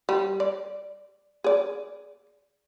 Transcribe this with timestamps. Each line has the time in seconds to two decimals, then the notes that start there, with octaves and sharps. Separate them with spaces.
0.09 G3
0.40 D5
1.44 G#4 D5